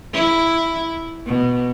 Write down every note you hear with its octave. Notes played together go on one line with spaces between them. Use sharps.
E4
B2